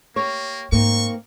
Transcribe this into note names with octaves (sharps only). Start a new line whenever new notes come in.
A#3 G4 C#5
G#2 A#3 C4 D#4 C#6